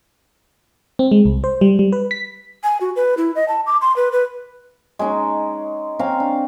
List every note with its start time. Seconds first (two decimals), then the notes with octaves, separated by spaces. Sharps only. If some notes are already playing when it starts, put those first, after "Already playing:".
0.99 C4
1.11 G#3
1.25 C2
1.44 C5
1.61 G3
1.79 G3
1.93 B4
2.11 B6
2.64 G#5
2.81 F#4
2.96 B4
3.17 E4
3.35 D#5
3.48 A5
3.66 D6
3.82 C6
3.96 B4
4.12 B4
4.99 G#3 C#4 D#4
5.99 C4 C#4 A#4 F5
6.20 D4